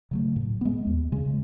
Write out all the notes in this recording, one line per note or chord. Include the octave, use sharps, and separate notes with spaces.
C#3 F#3 A3
A2
G#3 B3
D#2
C#3 G#3